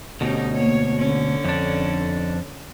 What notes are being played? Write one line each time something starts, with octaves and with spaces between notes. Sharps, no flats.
D2 B2 C#4 D#4 G4
A#3 C#5
D3 C#4
F2 D4